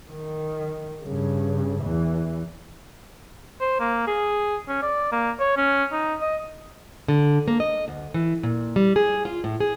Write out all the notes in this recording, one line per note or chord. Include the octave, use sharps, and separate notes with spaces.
D#3
G2 C#3
E2 E3
C5
A#3
G#4
C#4
D5
A#3
C#5
C#4
D#4
D#5
D3
A#3
D#5
D2
E3
A#2
G3
G#4
F4
A2
G#4